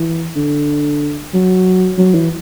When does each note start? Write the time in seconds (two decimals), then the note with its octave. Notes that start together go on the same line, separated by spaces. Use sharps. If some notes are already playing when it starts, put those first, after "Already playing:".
Already playing: E3
0.36 D3
1.34 F#3
1.98 F#3
2.15 E3